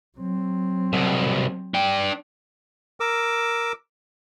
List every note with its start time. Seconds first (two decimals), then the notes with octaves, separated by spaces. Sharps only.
0.18 F#3 C4
0.93 C2 B2
1.74 D4 G5
3.00 A#4 D6 E6